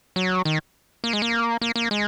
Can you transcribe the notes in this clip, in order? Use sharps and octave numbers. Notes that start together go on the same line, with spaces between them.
F#3
D#3
A#3
G#3
A#3
A#3
A#3
G#3